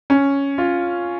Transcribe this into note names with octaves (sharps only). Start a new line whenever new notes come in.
C#4
F4